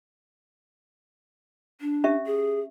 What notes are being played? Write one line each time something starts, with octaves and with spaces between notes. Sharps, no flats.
D4
C#4 G4 E5
G#4